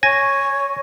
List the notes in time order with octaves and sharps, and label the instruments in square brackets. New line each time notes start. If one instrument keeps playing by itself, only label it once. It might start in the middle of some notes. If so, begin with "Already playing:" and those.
[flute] C#5 [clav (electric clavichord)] G#5 [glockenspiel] A#6